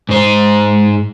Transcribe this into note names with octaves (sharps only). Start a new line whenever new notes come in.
G#2 C5